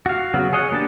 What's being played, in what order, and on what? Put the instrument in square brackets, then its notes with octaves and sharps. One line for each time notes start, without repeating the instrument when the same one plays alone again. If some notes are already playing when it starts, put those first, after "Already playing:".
[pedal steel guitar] F#4 F5
C#3 F#3 B3 F#4
G#4 C#5 D#5 F5 F#5
A#3 B3 D4 G4 A5